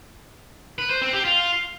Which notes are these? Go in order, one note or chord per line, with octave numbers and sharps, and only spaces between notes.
B4
C5
C4
G4
F4